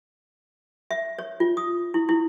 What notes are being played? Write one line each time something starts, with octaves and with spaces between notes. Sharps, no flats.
E5
C#5
F4
D#6
E4
E4